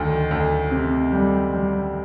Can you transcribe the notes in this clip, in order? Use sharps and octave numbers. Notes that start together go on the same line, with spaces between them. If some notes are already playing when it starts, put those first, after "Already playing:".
Already playing: D2 D#3
D2
C3
G3
G3